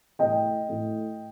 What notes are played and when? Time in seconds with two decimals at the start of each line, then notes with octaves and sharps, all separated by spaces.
0.19 A2 D#5 G5
0.69 A2